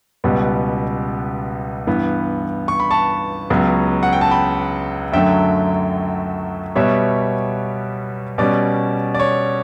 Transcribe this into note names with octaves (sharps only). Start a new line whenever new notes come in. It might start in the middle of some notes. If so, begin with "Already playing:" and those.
C#2 B2 G3 B3
G2 E3 B3
C#6
B5
A5 C#6
C#2 C#3 F#3 B3
F#5
G5
A5
G5 B5
F#2 D3 F#3 A3 E5 G5
B2 G3 B3 C#5 E5
B2 G3 C#4 D5
D5
C#5